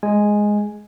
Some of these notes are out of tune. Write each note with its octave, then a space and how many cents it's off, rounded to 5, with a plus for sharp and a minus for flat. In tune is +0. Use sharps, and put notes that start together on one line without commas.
G#3 +0 G#5 +0